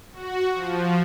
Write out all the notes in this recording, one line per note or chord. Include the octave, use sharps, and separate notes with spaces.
F#4
F3